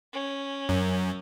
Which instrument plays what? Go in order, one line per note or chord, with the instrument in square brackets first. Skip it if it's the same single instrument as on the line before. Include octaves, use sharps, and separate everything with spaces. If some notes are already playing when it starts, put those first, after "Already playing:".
[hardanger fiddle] C#4
[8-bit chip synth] F#2